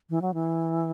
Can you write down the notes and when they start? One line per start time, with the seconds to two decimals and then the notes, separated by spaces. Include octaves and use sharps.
0.10 E3
0.22 F#3
0.34 E3